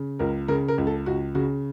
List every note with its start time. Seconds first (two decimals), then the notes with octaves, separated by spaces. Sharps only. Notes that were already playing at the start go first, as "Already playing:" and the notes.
Already playing: C#3
0.19 C#2 A#4
0.48 C#3 A#4
0.68 A#4
0.78 C#2
0.87 A4
1.06 C#2 F#4
1.35 C#3 F#4